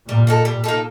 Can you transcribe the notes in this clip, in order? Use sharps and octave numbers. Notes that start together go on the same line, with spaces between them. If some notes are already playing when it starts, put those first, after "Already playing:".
A#2 G3
A#3 D#4 A4
G3
A#3 D#4 A4